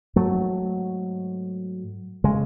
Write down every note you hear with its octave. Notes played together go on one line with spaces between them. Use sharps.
G#2 F#3 A3
C#3 G#3